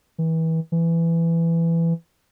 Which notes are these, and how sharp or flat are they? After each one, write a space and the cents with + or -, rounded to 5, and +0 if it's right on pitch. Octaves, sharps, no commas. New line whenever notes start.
E3 -30
E3 +15